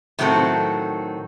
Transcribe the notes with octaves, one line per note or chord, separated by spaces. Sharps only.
A2 D#3 F#3 C4 A4